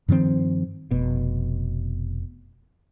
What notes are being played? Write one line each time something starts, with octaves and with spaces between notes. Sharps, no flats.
G2 D#3 F3 C4
F1 B2